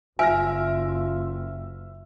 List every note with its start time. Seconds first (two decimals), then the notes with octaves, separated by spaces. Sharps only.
0.19 F#1 F4 E5 G#5 F6 A#6